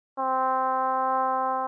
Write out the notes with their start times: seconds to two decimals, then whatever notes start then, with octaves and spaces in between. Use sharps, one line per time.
0.19 C4